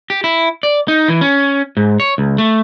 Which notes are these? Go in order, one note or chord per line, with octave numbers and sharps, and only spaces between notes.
G4
E4
D5
D#4
E3
C#4
G#2
C#5
C#2
A3